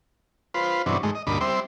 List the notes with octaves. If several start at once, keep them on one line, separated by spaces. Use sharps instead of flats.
F4 B4 C5
G2 B2 E3 F#3 C4 D4
G#2 D#3 G#3 A3
D#5
D2 G2 A#2 D#5 B5 D6
G3 C4 C5 E5